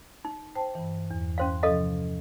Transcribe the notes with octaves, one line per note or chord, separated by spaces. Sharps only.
D#4
C5 G5 A5
G2 E3
E2
C#4 C5 F5 G5 C6 F#6
C3 F3 C#4 A4 D#5 F5